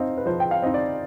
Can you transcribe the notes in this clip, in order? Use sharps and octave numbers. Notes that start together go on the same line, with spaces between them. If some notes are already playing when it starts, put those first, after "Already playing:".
Already playing: C4 D#4 D#5 F5
B4
F3 C5
G5
F5
C4 D#4 D#5
D5